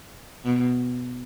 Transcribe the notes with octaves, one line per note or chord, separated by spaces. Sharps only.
B2